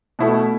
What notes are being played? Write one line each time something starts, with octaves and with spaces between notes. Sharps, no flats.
B2 A3 E4